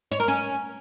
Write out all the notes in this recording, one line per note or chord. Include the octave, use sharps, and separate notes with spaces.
C#5
A#4
C#4